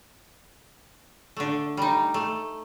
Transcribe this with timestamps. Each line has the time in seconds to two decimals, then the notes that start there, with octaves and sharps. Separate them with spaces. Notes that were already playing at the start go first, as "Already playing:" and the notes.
1.37 D3 A3
1.77 G3 D#4
2.14 A3